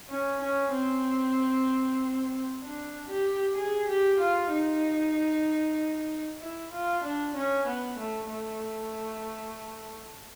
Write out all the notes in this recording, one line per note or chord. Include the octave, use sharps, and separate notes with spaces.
C#4
C#4
C4
D4
G4
G#4
G4
F4
D#4
E4
F4
D4
C#4
B3
A3
A3